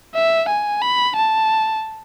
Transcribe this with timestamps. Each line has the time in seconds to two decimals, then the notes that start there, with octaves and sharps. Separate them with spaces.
0.15 E5
0.49 G#5
0.82 B5
1.16 A5